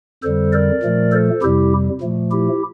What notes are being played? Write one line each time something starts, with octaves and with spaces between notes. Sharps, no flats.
F2 D3 G3 A4 C5
A#4 D5
A#2 F3 A3
A4 C5
F2 C3 G3 E4 G4
A#2 F3 A3
E4 G4